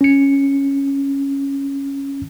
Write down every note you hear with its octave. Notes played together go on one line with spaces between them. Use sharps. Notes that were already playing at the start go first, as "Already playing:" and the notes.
C#4 C#7